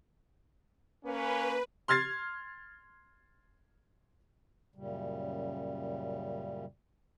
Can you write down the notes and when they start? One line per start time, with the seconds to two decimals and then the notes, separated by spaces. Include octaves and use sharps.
1.05 A#3 C#4 B4
1.88 C6 F6 G#6 A6 C7
4.76 F#2 A#2 C#3 G3